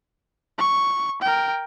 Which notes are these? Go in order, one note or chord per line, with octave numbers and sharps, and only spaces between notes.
C#6
A#4 G5